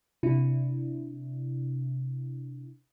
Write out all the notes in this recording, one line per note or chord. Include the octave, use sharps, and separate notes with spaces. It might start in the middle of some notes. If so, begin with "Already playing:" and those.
C3 D4 E4